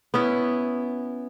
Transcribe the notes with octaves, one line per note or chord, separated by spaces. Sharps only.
B3 C#4 E4